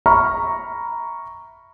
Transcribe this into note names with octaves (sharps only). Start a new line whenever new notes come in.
E5 A#5 B5 C#6 F6